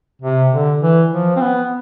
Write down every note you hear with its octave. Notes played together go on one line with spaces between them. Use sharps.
C3
D3
E3
F3
C4
B3